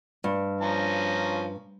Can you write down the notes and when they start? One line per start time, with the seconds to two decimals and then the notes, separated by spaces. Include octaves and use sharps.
0.24 G2
0.61 F3 C#4 A#5